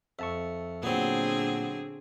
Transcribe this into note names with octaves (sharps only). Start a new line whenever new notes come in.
F2 E5 A5 C#6
A#2 D3 F#3 B3 C4 G#4